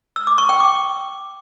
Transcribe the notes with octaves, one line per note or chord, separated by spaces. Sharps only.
E6
D6
C#6
G5
D6